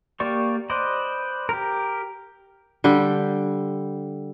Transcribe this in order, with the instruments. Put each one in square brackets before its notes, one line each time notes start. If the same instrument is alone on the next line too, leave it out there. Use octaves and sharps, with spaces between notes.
[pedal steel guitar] A#3 G4 D5 C#6
B4 C5 D5 D#5
G4 A#4
[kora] D3 G3 G4 G5